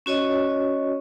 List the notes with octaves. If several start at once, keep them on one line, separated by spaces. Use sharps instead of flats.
C#4 F#4 C#5 D#5